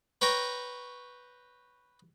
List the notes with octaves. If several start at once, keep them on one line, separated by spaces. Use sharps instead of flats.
B4 C#5 G5 A#5